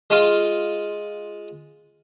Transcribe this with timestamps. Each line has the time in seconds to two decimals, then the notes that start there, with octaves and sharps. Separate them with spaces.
0.10 G#3 F4